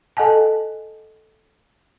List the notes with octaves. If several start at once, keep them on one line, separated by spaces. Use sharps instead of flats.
A4 D#5 F#5 G#5 A5